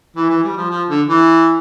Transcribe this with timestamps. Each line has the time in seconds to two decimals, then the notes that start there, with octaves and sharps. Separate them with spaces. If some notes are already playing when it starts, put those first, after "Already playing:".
0.16 E3
0.29 E3
0.43 G3
0.57 F3
0.70 F3
0.89 D3
1.07 E3